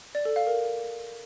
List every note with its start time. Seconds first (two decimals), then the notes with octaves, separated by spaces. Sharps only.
0.15 D5
0.25 A4
0.36 F5
0.47 A#4